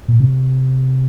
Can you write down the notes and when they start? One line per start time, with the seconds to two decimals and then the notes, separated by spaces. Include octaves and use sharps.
0.08 A#2
0.20 C3